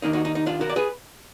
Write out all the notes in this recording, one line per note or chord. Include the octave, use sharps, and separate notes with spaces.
D#2 D#3 A#3 D4 D#4
D#4 F#4
D#4
D#4
D4 F4
F#4 A#4
D5
G#4 B4